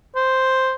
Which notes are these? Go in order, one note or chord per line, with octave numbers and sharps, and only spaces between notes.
C5